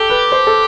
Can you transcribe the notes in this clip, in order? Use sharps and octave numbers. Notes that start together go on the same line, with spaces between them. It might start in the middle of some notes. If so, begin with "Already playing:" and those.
Already playing: G4 A4
B4
C5
A4